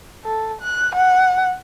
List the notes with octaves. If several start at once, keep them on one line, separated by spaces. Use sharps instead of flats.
A4
F#6
F#5